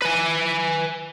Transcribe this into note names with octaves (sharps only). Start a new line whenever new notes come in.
B4 G#5